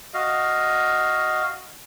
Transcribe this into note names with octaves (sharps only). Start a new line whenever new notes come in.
F#4 D#5 F5